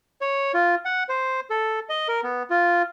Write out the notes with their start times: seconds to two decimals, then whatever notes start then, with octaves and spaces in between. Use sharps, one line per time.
0.21 C#5
0.54 F4
0.85 F#5
1.09 C5
1.50 A4
1.89 D#5
2.08 A#4
2.23 B3
2.50 F4